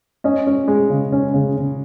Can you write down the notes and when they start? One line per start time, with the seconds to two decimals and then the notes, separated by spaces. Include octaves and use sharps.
0.24 C#4 D#5
0.47 C#4
0.68 G#3
0.90 C#3
1.12 C#4
1.34 C#3
1.56 C#3